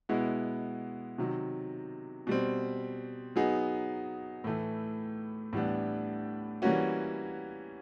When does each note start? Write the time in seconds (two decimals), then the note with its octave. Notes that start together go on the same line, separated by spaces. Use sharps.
0.09 B2 G#3 B3 E4
1.18 C3 D#3 F#3
2.27 B2 G3 C4
3.36 F#3 B3 D#4 G#4
4.44 A2 E3 A3
5.53 A2 E3 G3 B3 D4
6.62 E3 G3 A#3 C#4 F#4